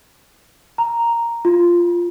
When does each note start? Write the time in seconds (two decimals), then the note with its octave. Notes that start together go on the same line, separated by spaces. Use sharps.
0.78 A#5
1.45 F4